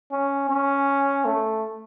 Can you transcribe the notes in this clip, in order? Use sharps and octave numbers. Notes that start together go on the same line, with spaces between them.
C#4
C#4
A3